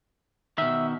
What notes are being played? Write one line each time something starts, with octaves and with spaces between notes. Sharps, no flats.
B2 D#3 E5